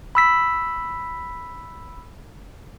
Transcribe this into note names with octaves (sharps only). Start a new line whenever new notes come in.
B5 E6 B6